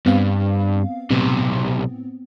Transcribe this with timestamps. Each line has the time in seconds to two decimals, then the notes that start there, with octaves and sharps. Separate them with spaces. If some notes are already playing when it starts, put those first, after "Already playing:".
0.06 G2 B3 C4 F5
1.10 B1 A2 C3 B3 C4